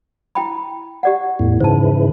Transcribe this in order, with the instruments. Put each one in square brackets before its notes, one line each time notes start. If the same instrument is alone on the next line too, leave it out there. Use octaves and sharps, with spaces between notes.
[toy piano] E4 G5 B5
G4 D5 F#5
[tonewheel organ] E2 A2
[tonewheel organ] G#2 C#3 E3 [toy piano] C5 A5